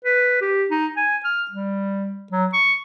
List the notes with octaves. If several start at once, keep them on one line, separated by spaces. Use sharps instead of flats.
B4
G4
D#4
G#5
F6
G3
F#3
C#6